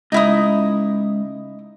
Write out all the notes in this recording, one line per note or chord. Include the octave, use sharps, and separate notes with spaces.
C#2 D#4 E4 D#6